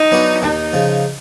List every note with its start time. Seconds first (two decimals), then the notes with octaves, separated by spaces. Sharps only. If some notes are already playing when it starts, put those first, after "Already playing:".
Already playing: D#4
0.12 F#3 B3 D4 F#4
0.43 D#2 D#4
0.73 C#3 F3